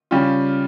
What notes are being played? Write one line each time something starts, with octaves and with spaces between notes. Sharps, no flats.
C#3 G3 C#4 F4